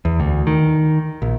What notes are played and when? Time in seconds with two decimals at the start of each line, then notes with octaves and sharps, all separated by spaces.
0.05 E2
0.20 D2
0.47 D#3
1.22 A#1